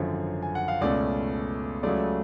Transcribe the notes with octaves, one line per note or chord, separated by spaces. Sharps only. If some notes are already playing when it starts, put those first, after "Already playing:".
Already playing: G#1 F#2 D3 F3 C#5
G#5
F#5
F5
C#2 B2 A3 C#4 D5
C#2 C#3 F#3 A3 D5